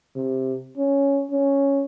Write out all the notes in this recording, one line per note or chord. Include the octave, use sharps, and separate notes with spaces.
C3
C#4
C#4